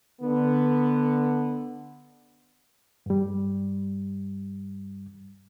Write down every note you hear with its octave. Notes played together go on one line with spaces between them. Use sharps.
D3 B3
G2 G3